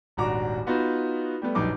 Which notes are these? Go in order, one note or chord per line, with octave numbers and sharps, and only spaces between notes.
D#1 G#1 D4 F#4 A#5 D6
B3 D#4 F4 F#4 B4
G3 A3 B3
D#1 A#1 F#2 D#4 B4 D6